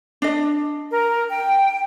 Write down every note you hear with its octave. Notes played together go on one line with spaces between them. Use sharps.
D4 D#5
A#4
G5